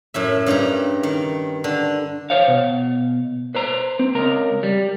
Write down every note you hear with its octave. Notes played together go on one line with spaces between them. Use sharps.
F#2 A2 E5
G2 C#3 G4 A#5
D#3
D3
C5 C#5 F5
B2
B4 C5 A#5
C4
C#2 A#4 A#5
G3